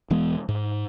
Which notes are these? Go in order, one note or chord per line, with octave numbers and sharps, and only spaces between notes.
E1 E3 G#3 B3
G#2